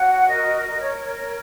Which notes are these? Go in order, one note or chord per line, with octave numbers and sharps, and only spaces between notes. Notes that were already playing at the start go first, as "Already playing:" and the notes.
Already playing: F#4 C#5 F#5
A#4 D#5
A#4 D#5
C#5
C#5
C#5